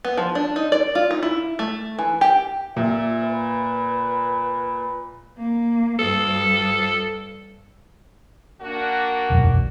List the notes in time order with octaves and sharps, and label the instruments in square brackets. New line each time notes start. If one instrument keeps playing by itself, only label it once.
[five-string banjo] B3
F3
D4
D#4
D5
F4
D#4
E4
A3
E3
G4
[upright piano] A#2 [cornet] E5
[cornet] B4
[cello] A#3
[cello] G2 [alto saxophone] A4
[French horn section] A#3 D4 F#4
[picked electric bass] E1 B1 F#2